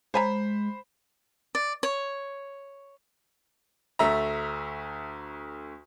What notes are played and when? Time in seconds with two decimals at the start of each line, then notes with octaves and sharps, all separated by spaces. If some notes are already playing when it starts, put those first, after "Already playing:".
0.14 G#3 C5 C#5 G#5 A#5 B5 B6
1.55 D5
1.83 C#5
3.99 D2 A3 E5 A#5